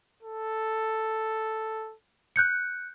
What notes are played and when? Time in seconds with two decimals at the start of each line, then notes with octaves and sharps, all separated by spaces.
0.22 A4
2.36 F#6 G6 C#7